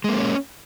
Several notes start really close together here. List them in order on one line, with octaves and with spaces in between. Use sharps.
G#3 A#3 C4 C#4